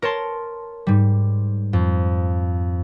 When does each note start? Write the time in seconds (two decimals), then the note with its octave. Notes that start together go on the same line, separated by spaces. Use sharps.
0.02 A#4 C#5 A5 C6
0.87 G#2 G3
1.73 F2